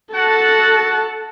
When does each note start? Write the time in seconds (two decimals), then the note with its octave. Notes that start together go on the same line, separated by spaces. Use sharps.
0.15 F#4 A4 F#5 A5